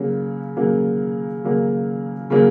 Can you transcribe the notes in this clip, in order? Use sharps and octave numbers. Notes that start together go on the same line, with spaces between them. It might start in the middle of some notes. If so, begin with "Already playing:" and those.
Already playing: C#3 F#3 A#3 C#4
C#3 F#3 A#3 C#4
C#3 F#3 A#3 C#4
C#3 F#3 A#3 C#4